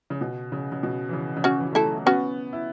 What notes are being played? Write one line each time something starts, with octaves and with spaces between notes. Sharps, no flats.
C#3
B2
C#3
C#3
B2
E3
C#3
C#3
C#4 F#4
E3
A3 E4 A4
F#3
B3 C#4 F#4
E4